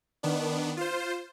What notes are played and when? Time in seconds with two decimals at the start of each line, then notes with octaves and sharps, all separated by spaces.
0.23 D#3 B3 D4
0.77 F4 C5